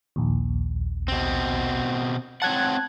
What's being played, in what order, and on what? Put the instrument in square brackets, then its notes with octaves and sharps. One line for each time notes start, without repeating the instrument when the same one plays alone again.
[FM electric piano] A#1 D#2
[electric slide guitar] B2 C4
[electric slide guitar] C4 C#5 F#5 [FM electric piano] A5 F#6 G#6